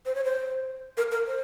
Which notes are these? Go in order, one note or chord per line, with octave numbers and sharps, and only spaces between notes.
C5
C#5
C5
A#4
A#4
C5